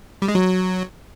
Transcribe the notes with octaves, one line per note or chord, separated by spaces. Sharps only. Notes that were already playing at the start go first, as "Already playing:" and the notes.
G3
G#3
F#3